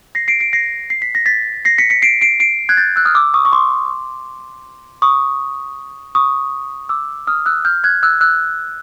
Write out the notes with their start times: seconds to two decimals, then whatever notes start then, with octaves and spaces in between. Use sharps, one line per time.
0.15 A#6 C7
0.28 C7 D7
0.40 C7 D7
0.53 A#6 C7
0.90 C7
1.02 B6
1.15 A#6
1.26 A6 B6
1.65 A#6 C7
1.78 B6 C#7
1.90 B6 C#7
2.02 C7 D7
2.21 C7 D7
2.40 C7 D7
2.69 F#6 G#6
2.77 G6 A6
2.96 E6 F#6
3.05 D#6 F6
3.15 D6 E6
3.34 C#6 D#6
3.45 C#6
3.52 C6 D6
5.02 C#6 D#6
6.15 C#6 D#6
6.89 D6 E6
7.27 D#6 F6
7.46 E6 F#6
7.65 F6 G6
7.84 F#6 G#6
8.03 E6 F#6
8.21 E6 F#6